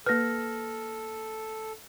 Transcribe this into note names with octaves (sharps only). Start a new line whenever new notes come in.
A#3 A4 B4 F6 A#6